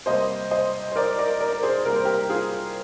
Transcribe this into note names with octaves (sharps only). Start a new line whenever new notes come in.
C3 G3 A#3 C5 D#5
C5 D#5
C5
A#4 D5
A#4 D5
A#4 D5
A#4
G#4 C5
C3 G3 A#3 A#4
C5
G4 A#4
F4 G#4